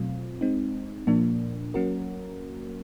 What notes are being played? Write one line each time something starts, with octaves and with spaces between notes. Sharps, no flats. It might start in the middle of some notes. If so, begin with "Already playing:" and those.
Already playing: B2 F#3 A3 C4 F4
G#3 C4 D#4
A#2 F3 A#3 D4
F#3 A#3 C#4 F#4 A#4